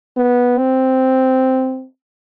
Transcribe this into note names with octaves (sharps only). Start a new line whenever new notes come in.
B3
C4